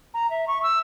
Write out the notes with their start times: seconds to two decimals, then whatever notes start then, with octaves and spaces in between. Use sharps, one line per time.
0.14 A#5
0.30 E5
0.48 C#6
0.63 E6